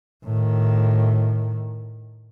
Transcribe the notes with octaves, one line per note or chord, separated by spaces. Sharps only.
A2 D#3